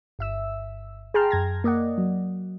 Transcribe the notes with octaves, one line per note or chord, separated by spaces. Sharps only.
G1 E5 E6
G#4 G5 A5 A#5 C6 F6
F#2 G#6 A#6
A#3 D5 D#5 F#5
F#3